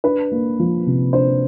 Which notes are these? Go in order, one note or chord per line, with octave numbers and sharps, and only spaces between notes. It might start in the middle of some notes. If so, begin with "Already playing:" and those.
D4 B4
A#3
F3
C3
D4 C5